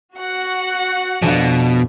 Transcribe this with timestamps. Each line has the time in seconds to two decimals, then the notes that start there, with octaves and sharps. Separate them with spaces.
0.16 F#4 F#5
1.22 F2 B2 D4 F5